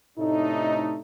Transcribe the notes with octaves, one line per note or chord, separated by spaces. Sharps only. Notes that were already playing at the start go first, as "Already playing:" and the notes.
A2 C3 A3 D4 D#4